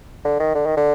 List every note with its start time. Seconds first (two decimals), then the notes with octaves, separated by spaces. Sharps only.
0.24 D3
0.39 D#3
0.54 D3
0.66 D#3
0.77 D3